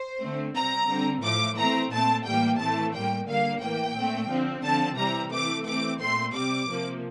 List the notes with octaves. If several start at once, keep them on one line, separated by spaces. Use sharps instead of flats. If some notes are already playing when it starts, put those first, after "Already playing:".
Already playing: C5
D3 A3 C4
C3 G3 C4 A#5
D3 G3 C4
A2 F3 A3 D6
E3 A3 C4 A#5
A#2 A3 C4 A5
A2 E3 G3 A#3 G5
A2 E3 A3 C4 A5
A2 G3 A#3 G5
D3 G3 A#3 F5
A2 E3 A#3 G5
A#2 A3 C4
D3 F3 C4
D3 F3 C4 A5
C3 E3 G3 C4 A#5
E3 A3 C4 D6
E3 A3 C4 D6
A#2 A3 C4 C6
C3 G3 C4 D6
C3 F3 A#3